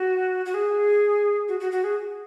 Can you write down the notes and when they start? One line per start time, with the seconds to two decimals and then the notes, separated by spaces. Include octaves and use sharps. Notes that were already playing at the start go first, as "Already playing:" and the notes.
Already playing: F#4
0.46 F#4
0.54 G#4
1.48 F#4
1.60 F#4
1.72 F#4
1.84 G#4